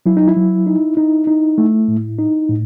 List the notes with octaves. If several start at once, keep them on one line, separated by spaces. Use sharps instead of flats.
F#3 E4
D#4
E4
F#3
D#4
D#4
D#4
A3
A2
D#4
A2